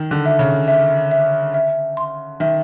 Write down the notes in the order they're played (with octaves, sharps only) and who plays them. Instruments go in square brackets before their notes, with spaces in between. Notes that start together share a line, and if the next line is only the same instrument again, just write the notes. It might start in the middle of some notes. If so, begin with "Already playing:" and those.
Already playing: [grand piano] D#3
D3
[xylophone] E5
[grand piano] C#3
[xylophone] E5
E5
E5
C6
[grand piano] D#3 [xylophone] E5